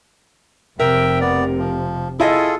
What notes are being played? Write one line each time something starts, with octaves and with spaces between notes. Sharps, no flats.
F1 C3 A#4 E5 G5
B3 D5
F3
E4 F4 G#4 A4 D#5